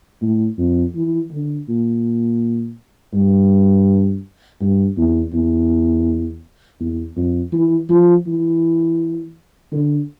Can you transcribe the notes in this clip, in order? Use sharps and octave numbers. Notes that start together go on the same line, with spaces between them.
A2
F2
E3
D3
A#2
G2
G2
E2
E2
E2
F2
E3
F3
E3
D3